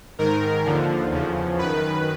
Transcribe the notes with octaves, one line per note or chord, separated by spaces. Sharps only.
G#2 D#3 A#4
D#2 D3 F3
E2 C#3 F3
F#2 D#3 B4